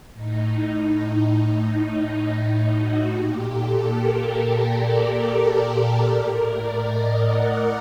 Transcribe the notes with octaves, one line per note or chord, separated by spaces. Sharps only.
A2 D#4
D#4
F#4
A#2 G4
A4
A#4
D5
A2 A#4
D5
D#5
F#5